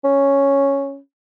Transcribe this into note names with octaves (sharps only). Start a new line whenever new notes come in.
C#4